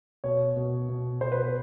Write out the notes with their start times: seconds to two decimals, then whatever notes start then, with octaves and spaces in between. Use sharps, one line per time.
0.24 B2 C#5
0.56 B2
0.89 B2
1.21 B2 C5
1.32 B4
1.42 B4